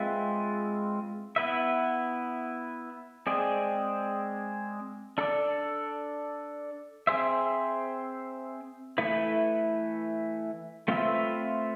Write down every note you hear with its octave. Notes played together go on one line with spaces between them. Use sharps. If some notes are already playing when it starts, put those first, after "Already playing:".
Already playing: G#3 C4 F4 B4 E5
B3 E4 B4 E5
G#3 C4 G#4 D5
D4 A4 D5
C4 G#4 C5 E5
E3 A3 E4 B4
A3 C4 F4 B4 E5